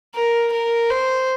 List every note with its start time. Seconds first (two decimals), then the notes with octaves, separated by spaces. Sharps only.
0.15 A#4
0.53 A#4
0.90 C5